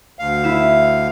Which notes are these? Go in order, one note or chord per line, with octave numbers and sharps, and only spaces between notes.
D2 F5
E4 E7